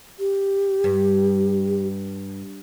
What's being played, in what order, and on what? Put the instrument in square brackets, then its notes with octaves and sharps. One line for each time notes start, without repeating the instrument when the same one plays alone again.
[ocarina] G4
[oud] G2